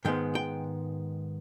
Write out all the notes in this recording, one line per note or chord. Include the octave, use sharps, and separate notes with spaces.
G#2 D#3 G#3 B3 G5
G5